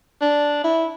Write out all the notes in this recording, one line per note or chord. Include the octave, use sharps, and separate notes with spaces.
D4
E4